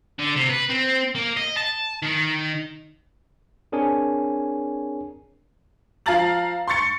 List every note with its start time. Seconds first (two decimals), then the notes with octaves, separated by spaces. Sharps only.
0.19 D3
0.36 C3
0.49 B4
0.70 C4
1.15 A#3
1.37 D#5
1.57 A5
2.02 D#3
3.72 C4 D4 G#4 A#4 C#5 G#5
6.06 F3 F5 A5 A#5 A6 F#7
6.67 C6 C#6 A6 C#7